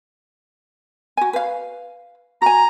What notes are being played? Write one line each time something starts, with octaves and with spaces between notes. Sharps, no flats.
F#4 G#5
B4 F5
F#4 G#5 A#5